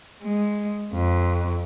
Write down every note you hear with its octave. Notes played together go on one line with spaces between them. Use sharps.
G#3
F2